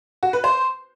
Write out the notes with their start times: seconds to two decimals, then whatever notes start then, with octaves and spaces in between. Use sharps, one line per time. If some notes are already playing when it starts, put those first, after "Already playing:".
0.23 F#4
0.33 B4
0.44 C5